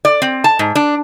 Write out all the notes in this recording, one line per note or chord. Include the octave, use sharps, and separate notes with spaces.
D5
C4
A5
G#2
D4